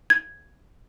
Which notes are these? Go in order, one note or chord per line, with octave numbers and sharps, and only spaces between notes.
G#6